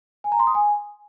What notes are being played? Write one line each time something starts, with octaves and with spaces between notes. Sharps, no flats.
G#5
A#5
C6
D#6
G#5